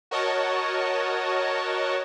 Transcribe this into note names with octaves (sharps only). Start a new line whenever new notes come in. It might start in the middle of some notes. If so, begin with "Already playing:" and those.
F#4 A#4 C#5 D#5 F#5 A5